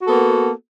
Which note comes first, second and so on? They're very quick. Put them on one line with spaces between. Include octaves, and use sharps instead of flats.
F#4 A4 B3 A#3